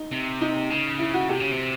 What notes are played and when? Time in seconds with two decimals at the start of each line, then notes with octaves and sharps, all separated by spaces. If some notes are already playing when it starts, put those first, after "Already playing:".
Already playing: D#4
0.12 C3
0.41 D#4
0.70 C#3
0.99 E4
1.14 F#4
1.29 C3 G4
1.40 C#3
1.51 C3